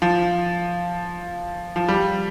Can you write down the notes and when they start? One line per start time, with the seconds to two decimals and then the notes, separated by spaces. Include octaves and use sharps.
0.02 F3
1.76 F3
1.88 G3